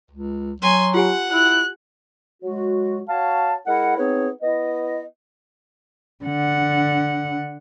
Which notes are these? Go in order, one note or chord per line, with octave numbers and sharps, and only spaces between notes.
C#2
F#3 G#5 C6
F4 G4 F#5 G#5
E4 F#6
F#3 G#3 F#4
F#4 C#5 F5 A5
G#3 E4 A#4 F#5
B3 C4 D#4 G#4 C#5
B3 E4 D#5
D3 F#5